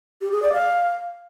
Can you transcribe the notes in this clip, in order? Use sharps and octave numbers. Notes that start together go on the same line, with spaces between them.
G4
G#4
D5
F5